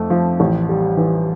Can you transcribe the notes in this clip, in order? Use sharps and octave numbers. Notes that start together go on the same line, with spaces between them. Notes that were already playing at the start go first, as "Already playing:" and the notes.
Already playing: F2 A3
F3
A1
G3
E3